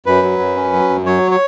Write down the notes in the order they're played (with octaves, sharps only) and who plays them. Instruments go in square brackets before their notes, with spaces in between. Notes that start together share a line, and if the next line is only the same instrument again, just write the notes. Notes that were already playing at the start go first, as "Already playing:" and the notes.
[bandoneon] F#2 B4
F#3
F#2
C#4
F#3
F#2
F#3 C#5
C#5